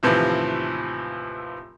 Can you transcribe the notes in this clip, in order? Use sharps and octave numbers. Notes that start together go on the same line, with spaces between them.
D#2 A2 C3 E3 F3